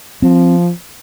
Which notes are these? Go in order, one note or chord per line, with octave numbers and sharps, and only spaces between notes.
F3 C4